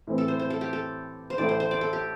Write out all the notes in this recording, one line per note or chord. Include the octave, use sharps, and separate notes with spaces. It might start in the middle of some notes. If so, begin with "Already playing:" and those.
A2 E3 C4 E4
A4
C5
C5
A4
G4
A4
C5
A1 A2 A3 E4 D5
C5
C5
D5
A4
G4